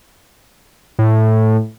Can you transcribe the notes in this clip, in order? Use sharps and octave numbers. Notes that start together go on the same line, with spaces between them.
A2